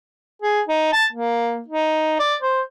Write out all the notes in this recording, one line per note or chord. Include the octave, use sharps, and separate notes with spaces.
G#4
D#4
A5
A#3
D#4
D5
C5